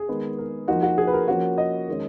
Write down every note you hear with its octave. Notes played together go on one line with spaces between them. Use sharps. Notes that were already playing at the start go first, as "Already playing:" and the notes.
Already playing: G#4
D#3 G#3 B3
A#4
F3 A#3 D#4 F#4
F#4
G#4
B4
A#4
F3 A#3 C#4 F#4
D#5
D#3 G#3 C#4